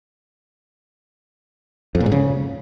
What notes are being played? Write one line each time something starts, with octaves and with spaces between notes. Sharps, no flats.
F2
A#2
G#2
C#3